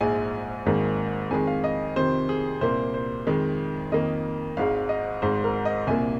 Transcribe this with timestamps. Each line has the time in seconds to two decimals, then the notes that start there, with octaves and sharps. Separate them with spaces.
0.01 A#1 G#2 G#3 G#5
0.66 G#1 G#2 D#3 A#3
1.31 F2 D#3 G#3 G#5
1.47 F5
1.64 D#5
1.96 F2 C3 D#3 C5
2.29 G#4
2.61 C2 A#2 A#3 C5
2.94 C5
3.27 F2 D#3 G#3
3.92 F2 D#3 A#3 D#5
4.57 G#1 G#2 G#3 F5
4.89 D#5
5.22 G#1 G#2 G#3 C5
5.44 A#4
5.65 D#5
5.87 C2 A#2 A#3 G#5